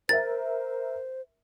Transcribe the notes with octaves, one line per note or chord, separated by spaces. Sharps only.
A#4 C5 E5 A6